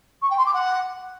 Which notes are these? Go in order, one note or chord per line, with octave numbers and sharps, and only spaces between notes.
C#6
G5
C6
D6
F#5